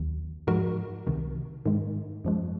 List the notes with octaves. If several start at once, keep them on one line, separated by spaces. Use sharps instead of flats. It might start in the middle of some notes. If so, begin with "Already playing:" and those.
Already playing: D#2 D#3 F#3
G#2 F3 G#3 F#4 A#4
C2 C3 D#3
G#2 D#3 G#3
F#2 F3 G#3